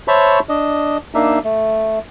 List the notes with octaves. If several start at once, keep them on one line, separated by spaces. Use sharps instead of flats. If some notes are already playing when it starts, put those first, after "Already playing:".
C5 C#5 E5 A5 B5 C#6
D4 D#5
A#3 D4 D#4 E5
A3